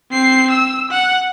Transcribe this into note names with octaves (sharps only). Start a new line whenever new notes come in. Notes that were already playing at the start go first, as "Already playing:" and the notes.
C4 C7
E6
F#5